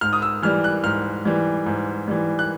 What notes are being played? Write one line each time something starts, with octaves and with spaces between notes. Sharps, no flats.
G#2 F6
D#6
E6
E3 G3 F6
F#6
G#2 F6
E3 G3
G#2
E3 G3
F#6